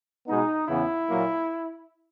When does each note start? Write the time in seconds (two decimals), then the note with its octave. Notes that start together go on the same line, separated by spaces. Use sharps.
0.28 B2 G#3 B3 D#4
0.68 E2 C#3 E3 B3 E4
1.09 A#2 F#3 A#3